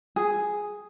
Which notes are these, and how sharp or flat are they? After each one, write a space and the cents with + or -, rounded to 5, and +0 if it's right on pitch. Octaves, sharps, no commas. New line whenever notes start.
G#4 +0